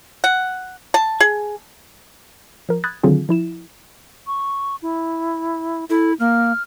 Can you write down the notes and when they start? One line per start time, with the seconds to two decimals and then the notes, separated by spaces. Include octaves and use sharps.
0.24 F#5
0.94 A5
1.20 G#4
2.69 F3 A#4
2.84 B5 D#6 F#6 G#6 A6
3.03 D3 D#3 F#3 C4 F4 G#4
3.29 F3 E4 E7
4.27 C#6
4.82 E4
5.90 E4 A4
6.20 A#3 F6